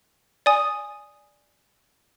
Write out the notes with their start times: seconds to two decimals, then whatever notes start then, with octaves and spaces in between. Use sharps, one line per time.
0.46 D5 G#5 D#6